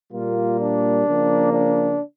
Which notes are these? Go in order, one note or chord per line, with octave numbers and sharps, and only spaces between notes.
A#2 G3 A#3 F4
D4
C#3 F3 A#3
D4